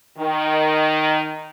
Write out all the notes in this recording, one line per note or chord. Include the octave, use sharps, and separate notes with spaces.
D#3